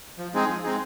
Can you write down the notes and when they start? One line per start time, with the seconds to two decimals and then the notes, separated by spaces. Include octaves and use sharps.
0.18 F3
0.34 G#3 C4 D#4 G#4
0.49 F3
0.63 G#3 C4 D#4 G#4